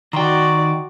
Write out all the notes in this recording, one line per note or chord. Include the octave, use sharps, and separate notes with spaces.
D#3 F#4 D5 G5 A#5 C6 C#6